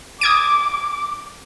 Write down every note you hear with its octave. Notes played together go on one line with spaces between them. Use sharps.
D6 D#6 G#6 D7